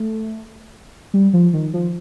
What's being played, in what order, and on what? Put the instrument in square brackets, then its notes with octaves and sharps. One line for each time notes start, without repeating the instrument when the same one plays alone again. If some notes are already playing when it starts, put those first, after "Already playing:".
Already playing: [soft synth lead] A3
G3
F3
D#3
F3